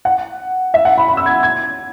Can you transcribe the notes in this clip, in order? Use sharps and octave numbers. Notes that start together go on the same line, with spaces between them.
F#5
E5
F#5
B5
B5
E6
G#6
G#6